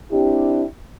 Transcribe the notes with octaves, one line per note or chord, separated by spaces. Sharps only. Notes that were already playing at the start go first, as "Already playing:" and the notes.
C4 D4 E4 G4